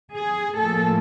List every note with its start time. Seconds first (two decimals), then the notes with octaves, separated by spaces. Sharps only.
0.13 G#4
0.56 A2 F3 A#3 A4